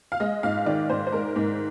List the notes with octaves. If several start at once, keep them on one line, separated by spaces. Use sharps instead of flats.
F5
G#3 D#5
G#2 F5
D#3 D5
G#2 C5
C5
G#3 A#4
G#2